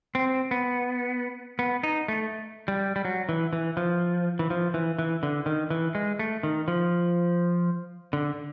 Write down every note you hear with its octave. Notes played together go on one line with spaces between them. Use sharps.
C4
B3
B3
D#4
A3
G3
G3
F#3
E3
E3
F3
E3
F3
E3
E3
D3
D#3
E3
G#3
A3
D#3
F3
D3